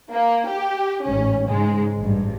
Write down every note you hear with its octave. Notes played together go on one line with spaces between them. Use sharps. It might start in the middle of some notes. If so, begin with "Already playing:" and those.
A#3
G4
A1 G#2 C#4
G#2 C#3 G#3
A1 G2